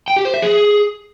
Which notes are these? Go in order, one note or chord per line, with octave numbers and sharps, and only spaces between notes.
G5
G4
C5
E5
G#4